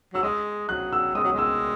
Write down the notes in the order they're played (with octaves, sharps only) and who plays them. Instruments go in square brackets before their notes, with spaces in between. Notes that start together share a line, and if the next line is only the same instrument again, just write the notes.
[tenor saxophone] F#3 [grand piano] E6
[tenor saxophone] G#3 [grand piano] D#6
[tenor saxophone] F#3 [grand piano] F#6
[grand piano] E6
[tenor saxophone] G#3 [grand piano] D#6
[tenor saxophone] F#3
G#3
[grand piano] E6